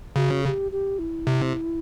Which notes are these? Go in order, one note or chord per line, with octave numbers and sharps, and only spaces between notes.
C#3 F#4
A4
G4
G4
E4
C3